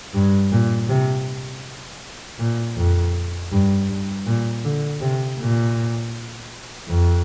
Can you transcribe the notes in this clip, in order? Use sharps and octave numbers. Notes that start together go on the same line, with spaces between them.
G2
A#2
C3
A#2
F2
G2
G2
A#2
D3
C3
A#2
F2